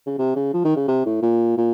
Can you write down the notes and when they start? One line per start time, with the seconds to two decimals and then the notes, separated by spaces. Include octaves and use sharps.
0.07 C#3
0.18 C3
0.36 C#3
0.54 F3
0.65 D#3
0.76 C#3
0.88 C3
1.06 A2
1.22 A#2
1.57 A#2